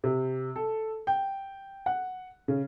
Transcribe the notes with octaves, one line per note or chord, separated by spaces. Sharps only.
C3
A4
G5
F#5
C#3